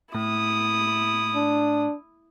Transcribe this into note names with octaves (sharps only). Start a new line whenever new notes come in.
A2 E4 D#6
D4